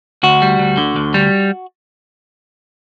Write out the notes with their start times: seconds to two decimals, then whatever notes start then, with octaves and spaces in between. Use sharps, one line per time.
0.23 D2 F#4
0.42 G3
0.59 D2
0.77 D3
0.96 D2
1.14 G3